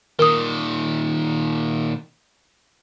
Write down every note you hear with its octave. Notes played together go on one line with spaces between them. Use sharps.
A#2 D#3 A#4 D#6